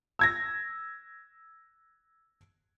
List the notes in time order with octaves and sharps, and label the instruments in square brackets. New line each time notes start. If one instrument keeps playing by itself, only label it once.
[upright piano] E6 G#6 A#6